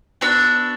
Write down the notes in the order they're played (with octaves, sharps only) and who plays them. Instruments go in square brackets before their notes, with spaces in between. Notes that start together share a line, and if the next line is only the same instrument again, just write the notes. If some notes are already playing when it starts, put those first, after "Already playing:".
[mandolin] B3 D4 F#4 E6